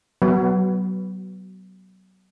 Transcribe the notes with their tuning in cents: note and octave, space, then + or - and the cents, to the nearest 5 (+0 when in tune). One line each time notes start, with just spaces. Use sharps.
F#3 +30 B3 +0 B4 -10